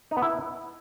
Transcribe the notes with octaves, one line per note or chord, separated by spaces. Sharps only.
D#4
B3
E4